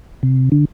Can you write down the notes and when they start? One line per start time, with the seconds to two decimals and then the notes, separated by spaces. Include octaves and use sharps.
0.23 C3
0.52 D3